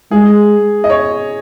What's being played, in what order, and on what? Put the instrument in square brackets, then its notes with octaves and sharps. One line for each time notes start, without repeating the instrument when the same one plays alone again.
[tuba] G#3 [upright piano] G#4
[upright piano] D#5
C#5